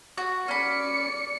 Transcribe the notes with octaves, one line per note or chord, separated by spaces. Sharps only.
F#4
C#4 D5 B5 C#7